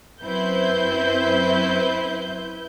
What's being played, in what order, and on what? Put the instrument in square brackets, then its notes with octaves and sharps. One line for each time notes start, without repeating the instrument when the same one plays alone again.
[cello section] F#2 C4 C5 [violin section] E4 B4 G6